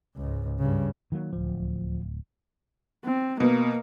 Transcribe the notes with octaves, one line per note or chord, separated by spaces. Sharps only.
C#2 G#2
G2 C#3
D#3 F#3 A#3
D1 C#2 F3
C4
B2 A#3